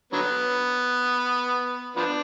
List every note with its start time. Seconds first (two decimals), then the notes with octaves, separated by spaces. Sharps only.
0.12 D3 F#3 B3
1.96 F3 B3 D4